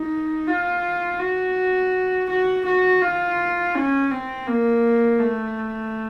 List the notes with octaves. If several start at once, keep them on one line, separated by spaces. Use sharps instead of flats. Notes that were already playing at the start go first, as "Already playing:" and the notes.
Already playing: D#4
F4
F#4
F#4
F#4
F4
C#4
C4
A#3
A3